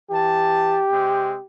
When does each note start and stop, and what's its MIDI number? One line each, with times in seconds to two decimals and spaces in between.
0.10 0.80 52
0.10 1.47 67
0.10 0.80 81
0.90 1.35 48
0.90 1.35 56
0.90 1.35 60